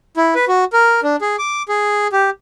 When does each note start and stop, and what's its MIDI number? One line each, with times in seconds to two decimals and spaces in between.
0.17 0.34 64
0.35 0.45 71
0.48 0.65 66
0.73 1.01 70
1.03 1.16 62
1.21 1.36 68
1.39 1.63 86
1.68 2.07 68
2.12 2.30 67